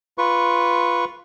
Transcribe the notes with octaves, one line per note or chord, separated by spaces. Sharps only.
F4 B4 C#6